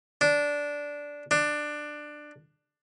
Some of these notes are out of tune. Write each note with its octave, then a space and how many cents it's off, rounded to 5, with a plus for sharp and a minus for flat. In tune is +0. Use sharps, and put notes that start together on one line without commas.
D4 -10
D4 +15